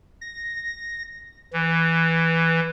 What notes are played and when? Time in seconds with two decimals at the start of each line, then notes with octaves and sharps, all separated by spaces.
0.21 A#6
1.53 E3